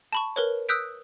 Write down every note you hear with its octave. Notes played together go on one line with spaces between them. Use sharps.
A5 B5 C#6
A#4 B4 C#5
D#6 E6 F#6 G6 B6 D7